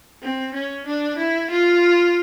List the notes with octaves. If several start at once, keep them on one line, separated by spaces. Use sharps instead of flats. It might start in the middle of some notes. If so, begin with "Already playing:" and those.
C4
C#4
D4
E4
F4